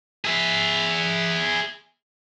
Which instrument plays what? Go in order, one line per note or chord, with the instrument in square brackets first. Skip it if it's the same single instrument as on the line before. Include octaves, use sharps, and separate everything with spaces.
[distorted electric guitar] G#4 E5